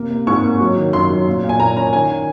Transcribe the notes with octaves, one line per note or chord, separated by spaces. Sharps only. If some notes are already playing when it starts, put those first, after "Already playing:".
Already playing: C3 A#3
A#3
G#2 C#6
A#3
F#3
D#3
F#2 C6
F#3
A#2
A#2
G#5
A#2 A#5
C#4 A#5
D#3 G#5